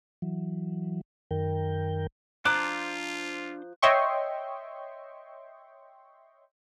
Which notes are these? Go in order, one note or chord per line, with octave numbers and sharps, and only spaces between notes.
E3 F#3
F#2 D#3 A#4 G5
F3 D4 F4 C5 A5 A#5 D6 F#6
C#5 D#5 E5 G5 C6 C#6